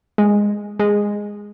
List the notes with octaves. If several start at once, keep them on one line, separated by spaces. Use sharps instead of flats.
G#3
G#3